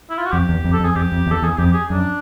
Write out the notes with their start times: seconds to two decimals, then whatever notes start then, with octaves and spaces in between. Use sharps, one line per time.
0.10 E4
0.18 F4
0.26 F#4
0.32 F2 G4
0.49 E2
0.64 F2
0.73 A4
0.80 F2
0.85 G#4
0.96 F2 G4
1.12 F2
1.27 E2
1.31 A4
1.42 E2 G#4
1.58 F2 G4
1.74 G#4
1.90 F#2 D4